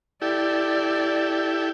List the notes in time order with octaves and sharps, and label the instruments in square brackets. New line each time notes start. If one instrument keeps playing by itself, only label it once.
[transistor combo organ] E4 G4 A4 [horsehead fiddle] D5